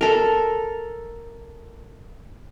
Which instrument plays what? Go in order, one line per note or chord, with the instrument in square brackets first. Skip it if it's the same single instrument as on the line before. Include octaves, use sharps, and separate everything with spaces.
[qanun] A4 A#4